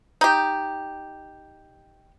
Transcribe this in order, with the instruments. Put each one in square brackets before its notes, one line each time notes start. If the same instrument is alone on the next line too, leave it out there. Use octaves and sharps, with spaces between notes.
[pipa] D#4 G4